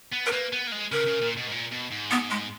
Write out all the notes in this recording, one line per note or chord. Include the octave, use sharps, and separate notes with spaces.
B3
A#4
A#3 B4
B3
A#3
G#3
C#3 A#4
C#3
A#2
B2
G#2
A#2
B2
G#2
B3
G#3